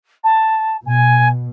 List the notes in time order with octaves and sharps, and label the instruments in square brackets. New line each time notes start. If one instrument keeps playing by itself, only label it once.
[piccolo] A5
[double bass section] B2 [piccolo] G#5